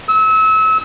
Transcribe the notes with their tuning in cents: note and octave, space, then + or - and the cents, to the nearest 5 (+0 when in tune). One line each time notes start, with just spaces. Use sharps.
E6 -30